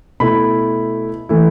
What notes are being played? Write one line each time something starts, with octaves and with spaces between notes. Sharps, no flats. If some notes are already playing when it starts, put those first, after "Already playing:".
B2 A3 E4 B5
E3 A3 E4